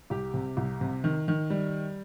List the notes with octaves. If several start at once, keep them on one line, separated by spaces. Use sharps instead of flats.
C2 G4
C3
C2
C3
D#3
D#3
G3